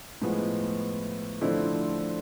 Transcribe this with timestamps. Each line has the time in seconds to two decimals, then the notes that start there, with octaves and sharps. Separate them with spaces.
0.22 A2 F3 G#3 B3
1.41 D3 F3 A3 C4 E4